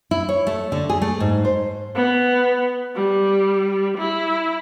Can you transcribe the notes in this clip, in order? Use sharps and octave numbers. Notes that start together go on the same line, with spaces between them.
E4
C#5
A3
D3
G#4
A3
G#2
C5
B3
G3
E4